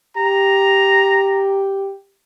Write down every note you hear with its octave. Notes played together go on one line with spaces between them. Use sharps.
G4 A#5